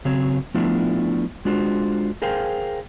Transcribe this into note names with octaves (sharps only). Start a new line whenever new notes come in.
C#3 F#3 C4 C#5
F3 A3 B3 D4 E4 F4
G#3 D4 F4 F#4 C5
G#4 A#4 C5 F5 G5